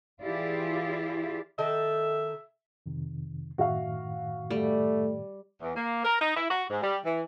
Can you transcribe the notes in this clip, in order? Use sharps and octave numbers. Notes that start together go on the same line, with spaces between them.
E3 E4 F4 G4 G#4 D5
D#3 A4 E5
F2 C3 D#3
F#2 A2 D#3 F#4 E5 F5
G3 A3
E2
A#3
A#4
D#4
E4
F#4
G#2
G3
E3